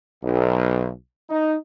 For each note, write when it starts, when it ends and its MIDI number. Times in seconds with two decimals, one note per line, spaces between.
0.23 0.90 35
1.29 1.56 63